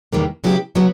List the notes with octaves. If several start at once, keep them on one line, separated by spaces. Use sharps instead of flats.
E2 C3 D#3 G3 A#3
C#3 F#3 B3 E4 G4
C#3 F#3 B3